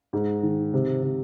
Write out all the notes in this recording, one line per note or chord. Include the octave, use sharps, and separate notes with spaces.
G#2
D#3
C3
C3